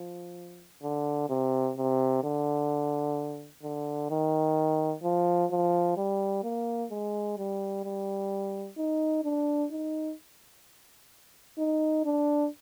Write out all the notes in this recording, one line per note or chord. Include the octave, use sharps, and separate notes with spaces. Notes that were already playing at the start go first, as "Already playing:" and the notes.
Already playing: F3
D3
C3
C3
D3
D3
D#3
F3
F3
G3
A#3
G#3
G3
G3
D#4
D4
D#4
D#4
D4